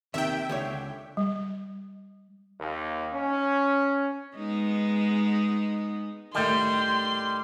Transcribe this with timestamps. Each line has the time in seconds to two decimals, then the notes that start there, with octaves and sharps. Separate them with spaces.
0.14 D#2 C3 D#3 E5 G5
0.49 C#2 D3 C#5
1.17 G3
2.60 D#2
3.13 C#4
4.36 G#3 B3 D#4
6.35 A2 D#3 G3 C6